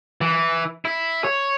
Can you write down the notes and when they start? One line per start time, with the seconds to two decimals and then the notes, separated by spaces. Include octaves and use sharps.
0.21 E3
0.85 E4
1.24 C#5